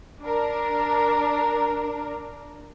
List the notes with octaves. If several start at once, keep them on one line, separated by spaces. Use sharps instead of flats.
D4 A#4